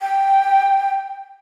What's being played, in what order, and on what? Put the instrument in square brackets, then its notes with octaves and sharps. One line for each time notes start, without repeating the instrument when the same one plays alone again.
[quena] G5